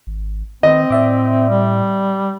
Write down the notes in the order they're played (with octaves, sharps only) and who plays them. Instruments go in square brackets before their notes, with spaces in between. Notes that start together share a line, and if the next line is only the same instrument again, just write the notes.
[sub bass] G#1
[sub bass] D#3 [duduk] C4 [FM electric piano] B4 [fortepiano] D#5
[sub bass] A2 [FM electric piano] D5 E5 D6
[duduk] G3